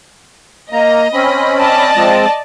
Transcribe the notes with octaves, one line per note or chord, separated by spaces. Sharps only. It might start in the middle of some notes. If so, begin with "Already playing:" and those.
A#3 D#5 A#5
C4 C#4 B5
D5 D#5 A5
F3 G#3 C4